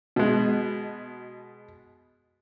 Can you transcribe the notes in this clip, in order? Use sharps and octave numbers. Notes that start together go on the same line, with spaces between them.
B2 G#3